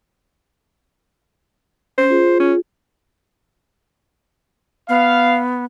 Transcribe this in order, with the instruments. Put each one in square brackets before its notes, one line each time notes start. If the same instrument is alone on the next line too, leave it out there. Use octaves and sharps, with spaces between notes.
[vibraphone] C#4 [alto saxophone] C5
[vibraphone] F4 G#4
[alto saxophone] C#4
[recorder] B3 [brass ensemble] F5